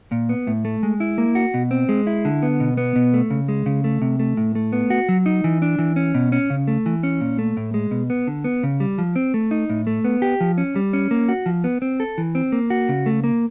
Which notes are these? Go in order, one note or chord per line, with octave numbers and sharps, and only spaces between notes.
A#2
B3
A2
A3
G#3
E4
A#3
F#4
B2
C4
G#3
E4
D3
B3
B2
B3
B2
A3
C#3
G#3
C#3
A3
C3
A3
A2
A3
B3
F#4
F#3
D#4
E3
D4
E3
C#4
B2
C#4
C#3
A3
E3
C#4
A#2
A3
A2
G#3
B2
B3
D3
B3
C#3
G3
F3
C4
A3
D#4
A2
A3
B3
G4
F3
C#4
G3
C#4
A#3
F#4
F3
B3
C4
A4
E3
C4
A#3
F#4
C#3
A3
A#3